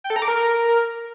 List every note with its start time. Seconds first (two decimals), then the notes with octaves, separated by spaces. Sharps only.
0.04 G5
0.10 A4
0.16 A#5
0.22 D6
0.28 A#4